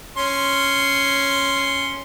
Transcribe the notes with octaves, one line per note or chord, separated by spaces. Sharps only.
C#4 C6